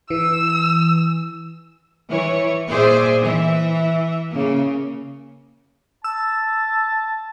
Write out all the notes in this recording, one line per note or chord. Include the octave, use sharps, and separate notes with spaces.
E3 E6
E3 C#5
A#2 G#4 C5 D5 E5
E3 E5
C#3 A#3
A5 E6